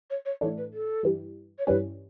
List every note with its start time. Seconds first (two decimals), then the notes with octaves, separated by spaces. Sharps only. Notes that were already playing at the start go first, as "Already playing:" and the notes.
0.10 C#5
0.25 C#5
0.41 A2 E3 A3 D4 C#5
0.57 B4
0.73 A4
1.03 G2 E3 G3
1.58 C#5
1.66 G2 E3 G3 C#4 B4